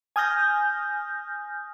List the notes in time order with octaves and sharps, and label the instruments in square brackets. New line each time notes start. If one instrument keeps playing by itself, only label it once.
[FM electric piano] G#5 D#6 F6 G6 A#6